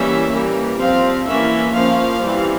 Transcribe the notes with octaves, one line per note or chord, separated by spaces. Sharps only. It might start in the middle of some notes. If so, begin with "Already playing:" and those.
Already playing: E3 G3 A#3 C#4 E5
E3 G3 A#3
F3 C4 F5
E3 A#3 C#4 E5
F3 A#3 C#4 F5
E3 G3 C4